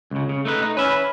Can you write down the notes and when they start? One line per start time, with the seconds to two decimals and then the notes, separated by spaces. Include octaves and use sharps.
0.11 C#2 C#3
0.29 C#3
0.45 A3 D#4 B4
0.62 D#4
0.77 C#4 B4 E5 B5